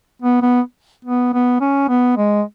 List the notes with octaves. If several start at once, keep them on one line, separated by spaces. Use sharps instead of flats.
B3
B3
B3
B3
C#4
B3
G#3